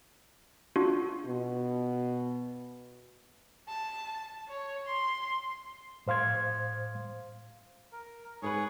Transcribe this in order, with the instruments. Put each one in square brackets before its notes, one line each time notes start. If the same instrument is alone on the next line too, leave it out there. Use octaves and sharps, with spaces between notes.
[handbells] D4 F4 F#4
[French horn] B2
[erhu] A5
C#5
C6
[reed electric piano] A2 C5 F5 C6 G#6
[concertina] A#4
[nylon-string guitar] G#2 A#4 B4 [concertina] G#4 C#5